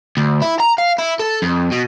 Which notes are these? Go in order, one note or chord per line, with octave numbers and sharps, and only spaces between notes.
D2
E4
A#5
F5
E4
A4
F2
B2